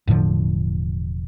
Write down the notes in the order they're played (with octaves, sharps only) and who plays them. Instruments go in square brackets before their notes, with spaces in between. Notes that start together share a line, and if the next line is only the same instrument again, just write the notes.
[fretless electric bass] E1 A2 D3 F3